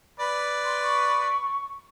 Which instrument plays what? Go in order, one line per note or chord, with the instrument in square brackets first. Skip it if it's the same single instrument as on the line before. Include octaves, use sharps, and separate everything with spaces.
[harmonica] B4 D5
[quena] C6
C#6